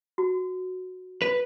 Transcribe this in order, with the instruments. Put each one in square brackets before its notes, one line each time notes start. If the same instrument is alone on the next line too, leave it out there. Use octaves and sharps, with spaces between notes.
[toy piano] F#4
[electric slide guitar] B4